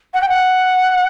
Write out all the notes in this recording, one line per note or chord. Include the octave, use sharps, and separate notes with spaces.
F#5
G5
F#5